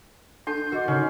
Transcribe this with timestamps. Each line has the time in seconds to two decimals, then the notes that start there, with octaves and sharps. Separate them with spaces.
0.47 D4 A4 A5 C6 G6
0.72 F#4 A#4 D#5 D6
0.88 C#3 C#4 D#4